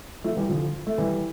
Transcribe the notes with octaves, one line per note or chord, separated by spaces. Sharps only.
F3 A3
E3 G3
D3 F3
A3
E3 G3